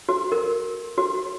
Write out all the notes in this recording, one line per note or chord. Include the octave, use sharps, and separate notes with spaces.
F#4
A#4
F#4